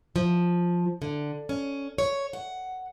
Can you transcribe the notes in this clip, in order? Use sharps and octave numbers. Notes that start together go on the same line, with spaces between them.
F3
D3
C#4
C#5
F#5